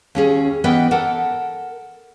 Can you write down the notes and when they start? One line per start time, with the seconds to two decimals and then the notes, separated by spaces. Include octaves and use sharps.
0.15 D#2 C#4 G#4
0.64 E3 B3 A#4 B4 D#5 G5
0.91 A4 A#4 F#5